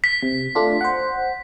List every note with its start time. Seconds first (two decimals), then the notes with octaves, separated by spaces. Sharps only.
0.04 B6
0.23 C3
0.55 A3 D4 F4
0.81 C5 F#5